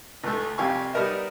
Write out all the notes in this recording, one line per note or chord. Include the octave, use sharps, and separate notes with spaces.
C#2 A3
C2 F2 G4 F5 G#5 C#6
G3 B3 D#4 A#4 D#5 E5